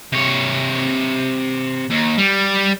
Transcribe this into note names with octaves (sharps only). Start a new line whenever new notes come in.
C3 C#5
D#2
G3